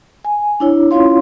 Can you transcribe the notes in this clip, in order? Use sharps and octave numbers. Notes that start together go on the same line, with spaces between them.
G#5
D4 E4 C#5
C#4 E4 F4 C#5 F5 C6